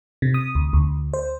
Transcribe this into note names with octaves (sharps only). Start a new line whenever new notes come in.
C3
D#6
D2
D2
C5